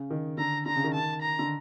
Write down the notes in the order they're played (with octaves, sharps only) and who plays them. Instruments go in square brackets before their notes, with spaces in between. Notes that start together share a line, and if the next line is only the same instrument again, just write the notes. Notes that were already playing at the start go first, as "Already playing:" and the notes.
Already playing: [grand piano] C#3
D#3
[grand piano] D3 [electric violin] A#5
[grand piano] D3 [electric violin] A#5
[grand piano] C#3
D#3
[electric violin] A5
A#5
[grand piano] D3